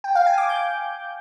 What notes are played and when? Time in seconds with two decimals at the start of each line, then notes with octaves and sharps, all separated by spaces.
0.04 G5
0.15 F5
0.26 G#5
0.38 D6
0.49 G6